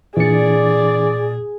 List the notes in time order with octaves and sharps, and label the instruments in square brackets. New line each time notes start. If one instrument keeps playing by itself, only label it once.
[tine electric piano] A#2 C#7 [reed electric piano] E3 D4 [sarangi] G#4 [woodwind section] D5